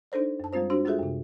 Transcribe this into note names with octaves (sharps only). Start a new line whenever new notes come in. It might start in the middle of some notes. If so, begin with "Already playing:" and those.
D4 D#4 A4 C5 D5
F#2 A5
G3 G#3 C4 F4 C5
D4 F#4 C5
G#3 F4 F#4 G#4 A4 E5
F#2 C3